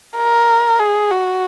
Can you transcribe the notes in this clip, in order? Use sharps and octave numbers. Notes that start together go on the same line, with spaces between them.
A#4
G#4
F#4